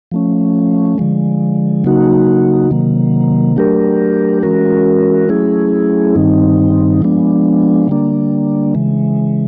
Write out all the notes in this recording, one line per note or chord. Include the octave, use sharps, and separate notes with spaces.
F3 A3 C#4
D3 F3 G#3
C#3 F#3 A#3 D#4 F#4
C3 D#3 F#3 A#3
F#3 A3 D4 G4 A#4
E3 G#3 C#4 F#4 A#4
F#3 A3 C#4 E4 G#4
G2 D#3 G3 C4 D#4
F3 G#3 B3 D4
D3 G3 A#3 D4
C#3 E3 G#3